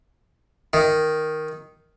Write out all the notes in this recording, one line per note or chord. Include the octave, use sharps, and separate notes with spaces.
D#3